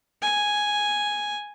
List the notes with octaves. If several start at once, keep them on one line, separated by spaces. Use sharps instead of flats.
G#5